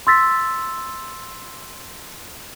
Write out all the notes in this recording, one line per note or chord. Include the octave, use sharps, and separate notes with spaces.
C6 E6 A6 B6